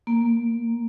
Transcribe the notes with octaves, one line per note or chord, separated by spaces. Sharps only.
A#3